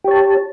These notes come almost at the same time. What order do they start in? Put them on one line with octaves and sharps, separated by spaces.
G4 C#5 A5